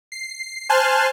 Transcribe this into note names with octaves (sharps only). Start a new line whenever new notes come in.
C7
C5 G#5 A5 C6 F6 F#6